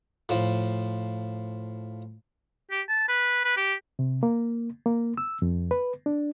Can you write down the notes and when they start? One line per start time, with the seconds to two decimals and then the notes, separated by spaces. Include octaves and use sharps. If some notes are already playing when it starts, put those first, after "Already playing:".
0.29 A2 F3
2.71 G4
2.89 A5
3.08 B4
3.44 B4
3.56 G4
3.99 C3
4.23 A#3
4.86 A#3
5.17 E6
5.42 F2
5.71 B4
6.06 D4